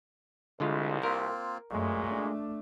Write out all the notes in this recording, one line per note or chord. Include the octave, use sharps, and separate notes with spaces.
C2 D3 G#3 F4
A#3 C4 F4 A#4
F#2 A#2 G#3 A3 F#4
A3 D4